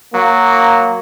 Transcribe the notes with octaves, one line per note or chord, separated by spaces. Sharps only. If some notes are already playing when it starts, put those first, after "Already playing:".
F#3 A#3